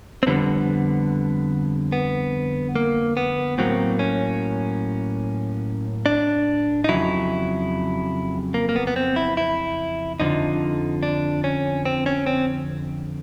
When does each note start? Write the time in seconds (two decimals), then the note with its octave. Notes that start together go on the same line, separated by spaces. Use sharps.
0.23 C4
0.27 F2 D3 G3 B3
1.92 B3
2.76 A#3
3.17 B3
3.58 A2 F#3 A#3 C4
3.99 C#4
6.06 D4
6.84 D#4
6.89 F2 C#3 F#3 E4
8.54 A#3
8.69 A#3
8.76 B3
8.87 B3
8.96 C4
9.16 E4
9.37 E4
10.20 F2 D3 F3 D#4
11.03 D4
11.44 C#4
11.85 C4
12.06 C#4
12.26 C4